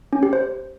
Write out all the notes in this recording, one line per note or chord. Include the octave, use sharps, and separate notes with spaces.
C#4
G4
C5